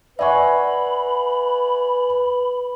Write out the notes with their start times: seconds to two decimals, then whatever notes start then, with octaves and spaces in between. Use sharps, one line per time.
0.19 B4 D5 E5 F#5 G#5 B5 C#6